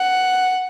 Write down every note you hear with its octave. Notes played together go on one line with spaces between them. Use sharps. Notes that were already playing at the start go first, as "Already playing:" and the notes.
Already playing: F#5